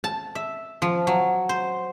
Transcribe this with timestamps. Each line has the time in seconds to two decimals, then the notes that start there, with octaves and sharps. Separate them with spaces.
0.04 A5
0.35 E5
0.82 F3
1.07 F#3
1.49 C5